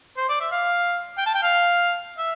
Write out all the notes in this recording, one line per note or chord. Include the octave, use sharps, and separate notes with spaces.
C5
D5
E5
F5
G5
A5
G5
F5
E5